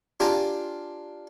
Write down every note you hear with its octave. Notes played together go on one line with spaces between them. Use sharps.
D4 F4 G4 G#5 A#5